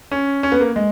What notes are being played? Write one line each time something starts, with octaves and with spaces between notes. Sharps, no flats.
C#4
C#4
B3
A#3
G#3